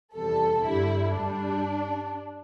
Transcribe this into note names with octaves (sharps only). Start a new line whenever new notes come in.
E2 C3 G3 A4
G2 D3 G3 E4
G2 G3 D4